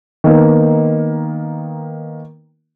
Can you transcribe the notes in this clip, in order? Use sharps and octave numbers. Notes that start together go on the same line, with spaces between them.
D#3 A#3 B3